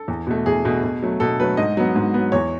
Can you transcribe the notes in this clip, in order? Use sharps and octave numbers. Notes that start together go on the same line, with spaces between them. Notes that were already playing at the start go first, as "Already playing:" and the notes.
Already playing: A4
E2
B2 A3
E2 G#4
B2 A3
B2
F#3 A3
B2 A4
F#3 A3 B4
G#2 D#5
F#3 B3
G#2
F#3 B3
E2 C#5